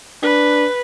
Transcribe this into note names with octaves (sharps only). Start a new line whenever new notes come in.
D4 B4